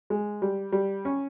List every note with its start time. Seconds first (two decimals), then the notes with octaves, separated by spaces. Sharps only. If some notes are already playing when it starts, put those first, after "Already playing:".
0.10 G#3
0.42 G3
0.72 G3
1.05 C#4